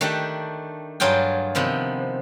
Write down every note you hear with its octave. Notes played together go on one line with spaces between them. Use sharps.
D#3 A3 D4 G4
G2 F#3 F4 G#4 G5
C3 D#3 F3 B3